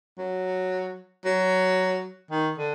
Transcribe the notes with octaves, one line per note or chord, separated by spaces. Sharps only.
F#3
F#3
D#3
D3